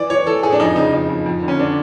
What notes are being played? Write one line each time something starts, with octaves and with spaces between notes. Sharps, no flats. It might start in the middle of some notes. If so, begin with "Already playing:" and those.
Already playing: E3 D5
E3 C#5
E3 A4
A2 G#4
D4
F2 D#4
C#3 D#4
F2 D#4
F2
F2
D3
C#4
D3 D4